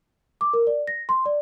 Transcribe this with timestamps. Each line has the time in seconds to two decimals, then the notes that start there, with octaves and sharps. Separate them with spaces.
0.41 D6
0.53 A#4
0.67 D5
0.87 A#6
1.09 C6
1.26 D5